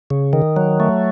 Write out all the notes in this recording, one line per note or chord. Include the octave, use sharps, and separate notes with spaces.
C#3
D#3
F#3
A3